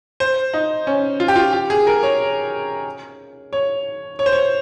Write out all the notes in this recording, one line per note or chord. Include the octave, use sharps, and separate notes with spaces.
C5
D#4
C#4
F4
G4
F4
G4
G#4
A#4
C#5
C#5
C#5
C5
C#5